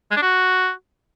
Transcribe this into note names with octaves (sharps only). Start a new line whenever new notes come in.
G#3
D4
F#4